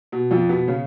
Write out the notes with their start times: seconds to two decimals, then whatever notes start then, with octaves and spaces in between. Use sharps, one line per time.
0.12 B2
0.31 F2 F3
0.49 B2 B3
0.68 C#3 C#4